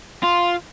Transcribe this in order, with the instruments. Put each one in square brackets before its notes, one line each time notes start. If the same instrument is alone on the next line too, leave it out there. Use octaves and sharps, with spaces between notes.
[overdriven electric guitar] F4